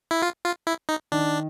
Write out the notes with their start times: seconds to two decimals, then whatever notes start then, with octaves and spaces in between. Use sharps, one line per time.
0.11 E4
0.22 F4
0.45 F4
0.67 E4
0.89 D#4
1.12 D#3 D4